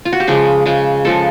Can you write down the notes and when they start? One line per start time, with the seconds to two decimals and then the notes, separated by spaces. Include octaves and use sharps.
0.05 F4
0.13 F#4
0.20 G4
0.27 C#3 F3 G#3 G#4
0.66 C#3 F3 G#3
1.05 C#3 F3 G#3 A4